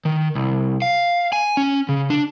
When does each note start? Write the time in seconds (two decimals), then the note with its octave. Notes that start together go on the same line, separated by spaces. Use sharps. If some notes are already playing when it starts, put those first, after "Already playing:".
0.05 D#3
0.35 C2
0.82 F5
1.33 G#5
1.57 C#4
1.89 C#3
2.10 D4